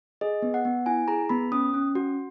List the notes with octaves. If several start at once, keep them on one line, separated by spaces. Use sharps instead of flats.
G#4 D#5
B3
F#5
B3
E4 G#5
G#4 A#5
B3 B5
C#4 D#6
C#4
F#4